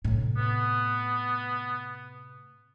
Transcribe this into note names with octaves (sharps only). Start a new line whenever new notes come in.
A2 C3
B3